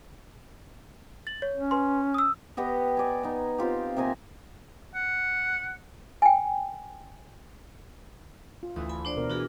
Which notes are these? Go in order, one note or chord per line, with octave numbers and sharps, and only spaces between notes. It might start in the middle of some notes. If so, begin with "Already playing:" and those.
A6 F#7
C#5
C#4
B4 G#5 C6
D#6 E6
B3 G4 D#5 F#5
D5 G#5
B3 D#4
C4 F4 G4
C3 A#3 D#5 G#5
F#5
G5 G#5
F4
D2 E3 A3 D#6
G#5 B5
D4 C5 D5
B2 B3 A#4
E3 D4 F#4 G#4